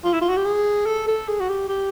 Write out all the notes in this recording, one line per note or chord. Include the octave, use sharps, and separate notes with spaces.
F4
E4
F4
F#4
G4
G#4
A4
A4
G#4
F#4
G4
G4